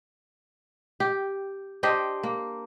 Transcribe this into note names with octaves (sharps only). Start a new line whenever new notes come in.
G4
D4 G4 C5 D#5
A#3